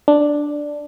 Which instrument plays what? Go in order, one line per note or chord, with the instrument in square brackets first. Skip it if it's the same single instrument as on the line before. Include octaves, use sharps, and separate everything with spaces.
[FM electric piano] D4